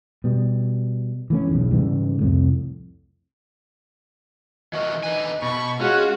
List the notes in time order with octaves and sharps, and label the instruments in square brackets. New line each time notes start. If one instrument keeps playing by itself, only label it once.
[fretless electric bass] B2 G3
E3 A3 C#4
B1 E2 G#2
G#2 C#3 E3 G3
C2 F2 A2
[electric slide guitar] E3 F#4 A#4 [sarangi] D#5
[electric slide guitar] D3 B4 G#5 [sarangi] D#4
[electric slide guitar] B2 [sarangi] B5 [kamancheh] C#6
[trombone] G#3 [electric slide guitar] C#4 [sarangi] F4 [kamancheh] F#4